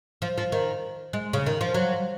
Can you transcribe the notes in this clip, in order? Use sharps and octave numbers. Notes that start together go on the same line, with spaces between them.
F3
F3
D#3
G#3
C#3
D#3
F3
F#3